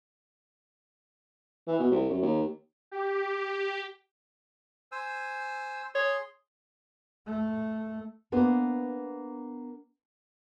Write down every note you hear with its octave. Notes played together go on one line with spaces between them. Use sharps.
E3
B2
C2
F#2
D#2
G4
C5 G#5 E6
G#4 C#5 C6
A3
A#3 B3 D4 C5